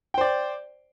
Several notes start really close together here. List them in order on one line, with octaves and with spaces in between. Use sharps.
G5 C5 D5